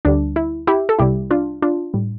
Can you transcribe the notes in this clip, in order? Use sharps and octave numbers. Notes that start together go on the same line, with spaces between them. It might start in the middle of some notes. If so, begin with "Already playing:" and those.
D2 D3 G3 D4
E4
E4 G4
A4
C2 C3 G3 E4 G4
D4 F4
D4 F4
A2 G3